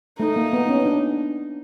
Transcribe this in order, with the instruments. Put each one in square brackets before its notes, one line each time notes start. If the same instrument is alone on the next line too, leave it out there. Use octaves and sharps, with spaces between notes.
[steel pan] A3 [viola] D#4
[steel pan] A#3
B3
C#4
D4